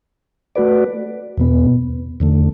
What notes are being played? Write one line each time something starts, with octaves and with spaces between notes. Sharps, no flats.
A3 F#4 B4 D5
E2 B2 B3
E2 D3 A3